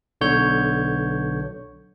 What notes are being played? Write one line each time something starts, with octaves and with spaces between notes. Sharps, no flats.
B1 D3 C#5 G6